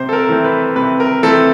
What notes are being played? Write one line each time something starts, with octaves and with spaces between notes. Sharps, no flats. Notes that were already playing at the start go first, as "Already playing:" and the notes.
Already playing: C3 C5
A4
A#4
E3 A3 C4
B4
C3 B4
A#4
E3 A3 C4 A4